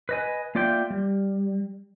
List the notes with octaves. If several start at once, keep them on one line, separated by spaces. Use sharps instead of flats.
B4 D#5 G#5
A#3 F4 D5 E5 G5
G3